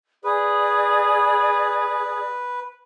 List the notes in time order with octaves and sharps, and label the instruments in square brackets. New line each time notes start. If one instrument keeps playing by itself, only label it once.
[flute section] G#4 D5 D#6 [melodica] B4